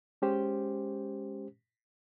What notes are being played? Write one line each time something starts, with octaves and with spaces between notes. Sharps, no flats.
G#3 C#4 G4 C5